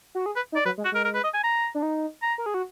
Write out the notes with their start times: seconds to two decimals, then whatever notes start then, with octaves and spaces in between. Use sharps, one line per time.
0.15 F#4
0.26 G#4
0.36 B4
0.52 D#4
0.56 D5
0.65 F#3 B4
0.78 G#3
0.85 F#4
0.92 G#3 A#4
1.04 A#4
1.14 B4
1.24 D#5
1.34 G#5
1.43 A#5
1.75 D4
1.82 D#4
2.22 A#5
2.38 A#4
2.46 G#4
2.54 F#4